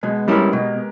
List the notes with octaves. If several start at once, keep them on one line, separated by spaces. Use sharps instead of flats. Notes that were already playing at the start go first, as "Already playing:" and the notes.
B2 G#3 B3
G3 C#4 E4 G4 A#4
B2